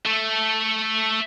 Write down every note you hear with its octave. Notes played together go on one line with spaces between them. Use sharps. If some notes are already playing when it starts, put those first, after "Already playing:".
A3 A4